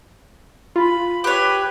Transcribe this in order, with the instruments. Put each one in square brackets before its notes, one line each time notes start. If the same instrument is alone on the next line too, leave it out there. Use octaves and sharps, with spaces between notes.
[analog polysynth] F4 [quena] B5
[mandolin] G4 C#5 [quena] B4